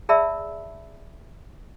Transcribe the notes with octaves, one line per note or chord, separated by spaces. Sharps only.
G#4 D5 E5 A5 B5 E6